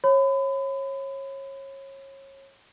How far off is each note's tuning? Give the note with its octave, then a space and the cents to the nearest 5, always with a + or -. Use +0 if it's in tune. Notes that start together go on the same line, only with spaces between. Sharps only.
C#5 -30 B5 +35